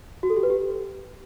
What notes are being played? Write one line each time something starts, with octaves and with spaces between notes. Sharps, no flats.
F#4
A4
G4
B4
G4